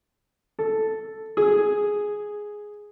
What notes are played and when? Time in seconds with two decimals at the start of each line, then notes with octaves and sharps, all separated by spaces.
0.59 A4
1.37 G#4